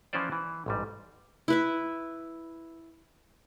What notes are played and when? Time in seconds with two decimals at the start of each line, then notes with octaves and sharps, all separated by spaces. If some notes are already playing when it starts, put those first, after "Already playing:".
0.13 E3 F3 C#4 F4 C5 D5
0.32 E3
0.66 A1 G#2 G3
1.48 E4 B4 E5